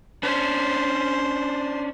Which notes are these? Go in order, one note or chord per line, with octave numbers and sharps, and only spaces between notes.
C#4 D4 C5